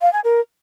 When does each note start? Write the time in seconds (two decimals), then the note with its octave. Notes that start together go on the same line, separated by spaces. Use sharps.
0.02 F5
0.13 G#5
0.24 A#4